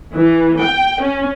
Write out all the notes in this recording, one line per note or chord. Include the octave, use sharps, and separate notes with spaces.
E3
G5
C#4